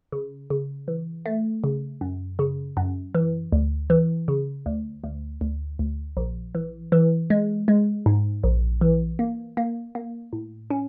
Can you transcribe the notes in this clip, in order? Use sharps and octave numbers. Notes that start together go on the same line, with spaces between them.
C#3
C#3
E3
A3
C#3
F#2
C#3
F#2
E3
D2
E3
C#3
D2
D2
D2
D2
A#1
E3
E3
G#3
G#3
G#2
A#1
E3
A#3
A#3
A#3
A2
C#4